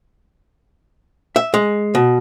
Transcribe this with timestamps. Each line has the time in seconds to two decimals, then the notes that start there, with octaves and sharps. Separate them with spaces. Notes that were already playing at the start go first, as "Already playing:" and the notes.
1.36 E5
1.54 G#3
1.95 B2